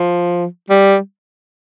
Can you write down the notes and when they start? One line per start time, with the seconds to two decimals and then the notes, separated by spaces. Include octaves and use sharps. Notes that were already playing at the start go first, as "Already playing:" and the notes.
Already playing: F3
0.70 G3